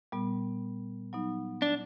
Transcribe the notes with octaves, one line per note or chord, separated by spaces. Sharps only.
A#2 G3 B3
F#3 B3 D#4
D4